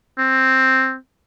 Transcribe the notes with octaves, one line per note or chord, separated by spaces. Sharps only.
C4